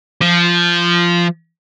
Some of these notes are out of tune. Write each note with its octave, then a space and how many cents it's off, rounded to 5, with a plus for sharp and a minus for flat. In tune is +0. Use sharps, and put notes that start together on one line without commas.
F3 -10